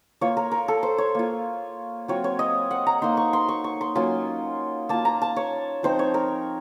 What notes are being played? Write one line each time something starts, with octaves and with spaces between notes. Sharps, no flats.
A#3 F4 C#5
A#4
A#4
A4
C5
C#5
A#3 F4
F#3 C4 F4 C#5
C#5
D#5
F#5
A#5
A#3 D#4 C6
C#6
C6
C#6
C#6
C6
F#3 A#3 C#4 F4 C6
A#3 F4 A5
A#5
A5
C#5
F3 C4 D#4 C5
C#5
A#4